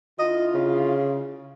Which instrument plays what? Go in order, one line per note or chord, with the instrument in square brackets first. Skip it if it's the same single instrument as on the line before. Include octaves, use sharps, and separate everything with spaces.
[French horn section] D3 E4 F4 [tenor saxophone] D#5
[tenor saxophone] C#3